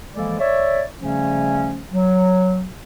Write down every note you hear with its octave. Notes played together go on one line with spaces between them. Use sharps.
E3 F3 G#3 A#3 A4 D5
C#5 D5 E5
C#3 F3 G3 A3 C#4
F#3